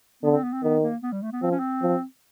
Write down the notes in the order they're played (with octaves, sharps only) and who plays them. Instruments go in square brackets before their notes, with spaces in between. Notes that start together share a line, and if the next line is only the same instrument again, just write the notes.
[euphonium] D3 [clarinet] B3
[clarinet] C4
B3
C4
[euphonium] D#3 [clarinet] B3
[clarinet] A#3
B3
G3
A3
B3
[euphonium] F3 [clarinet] C4
[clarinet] C#4
C4
[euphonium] F3